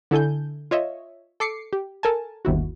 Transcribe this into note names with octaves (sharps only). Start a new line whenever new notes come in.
D3 E4 A4 G#5 G6
F4 C#5 D#5 E5
A4 D6 C7 C#7
G4
A4 A#4 G#5 A5
G1 D#2 E4 F#4